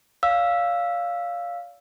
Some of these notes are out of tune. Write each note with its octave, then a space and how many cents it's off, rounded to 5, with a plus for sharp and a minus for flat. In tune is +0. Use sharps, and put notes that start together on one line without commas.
D5 -45 F5 +0 E6 +0